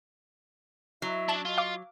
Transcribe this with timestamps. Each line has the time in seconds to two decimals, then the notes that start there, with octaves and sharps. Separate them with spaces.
1.02 F#3 E4 D#5 E5
1.28 D4 A5 E7
1.45 F4 D#5
1.58 F5 D6